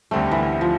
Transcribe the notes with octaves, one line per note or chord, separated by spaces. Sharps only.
D2 D3 G3 A3 C4
E3
F3